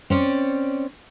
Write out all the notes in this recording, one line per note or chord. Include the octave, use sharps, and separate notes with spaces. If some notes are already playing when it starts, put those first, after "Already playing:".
C4 C#4 D5